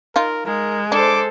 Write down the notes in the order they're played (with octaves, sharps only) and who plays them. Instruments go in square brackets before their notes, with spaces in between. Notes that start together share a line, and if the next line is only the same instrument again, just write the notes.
[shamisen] D#4 F4 [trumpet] A#4
[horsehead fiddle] G#3 [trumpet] A#4
[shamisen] D4 [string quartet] A4 C5 [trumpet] D6